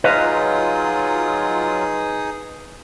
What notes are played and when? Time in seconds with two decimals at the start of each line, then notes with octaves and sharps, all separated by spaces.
0.04 F#3 D#4 F4 G#4 B4 D#5 F5 D#6